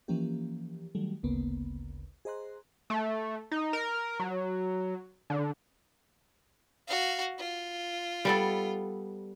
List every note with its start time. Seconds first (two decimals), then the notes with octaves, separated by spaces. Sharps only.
0.08 E3 F3 A#3 C#4 G4
0.95 D#3 F#3 G3 A3
1.23 G#1 D2 C#3 A#3 B3
2.25 G#4 C5 D#5 A#5 C6 F#6
2.90 A3
3.51 D#4
3.73 A#4
4.20 F#3
5.30 D3
6.87 F#4 F5
7.38 F4
8.25 G3 B3 A4